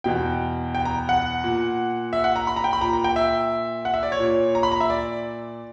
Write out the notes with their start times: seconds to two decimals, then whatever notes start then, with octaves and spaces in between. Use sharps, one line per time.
0.04 E2 B2 G5
0.75 G5
0.85 A#5
1.09 F#5
1.44 A#2
2.13 E5
2.24 F#5
2.36 A#5
2.47 B5
2.56 A#5
2.64 G5
2.73 B5
2.81 A#2 A#5
2.93 A#5
3.04 G5
3.16 E5
3.85 F#5
3.94 E5
4.03 D5
4.12 C#5
4.20 A#2
4.55 A#5
4.63 B5
4.72 A#5
4.80 E5
4.90 D5